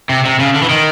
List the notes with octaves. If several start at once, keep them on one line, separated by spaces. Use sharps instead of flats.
C3
C3
C#3
D3
E3
D#3